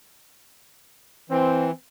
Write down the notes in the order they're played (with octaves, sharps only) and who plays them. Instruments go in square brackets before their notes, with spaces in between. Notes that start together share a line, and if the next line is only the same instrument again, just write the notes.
[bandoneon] E3 [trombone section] C4